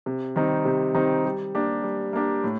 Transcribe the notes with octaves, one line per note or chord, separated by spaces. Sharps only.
C3
D#3 G3 C4 D#4
C3
D#3 G3 C4 D#4
G3
A#3 D4 G4
G3
A#3 D4 G4
A2